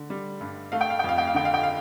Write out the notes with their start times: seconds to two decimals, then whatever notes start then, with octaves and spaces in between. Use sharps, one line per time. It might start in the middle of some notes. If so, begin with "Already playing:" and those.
Already playing: D3
0.10 G3
0.41 G2
0.72 A3 F5
0.81 G5
0.90 F5
0.99 G5
1.04 F2 F5
1.18 G5
1.27 F5
1.34 D3 G5
1.45 F5
1.54 G5
1.63 F5